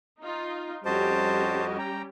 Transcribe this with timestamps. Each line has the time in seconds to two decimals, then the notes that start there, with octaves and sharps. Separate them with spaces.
0.19 D#4 F4
0.85 F2 G3 C#4 F#4 G4 C5 D#5 A5
1.79 G5 A#5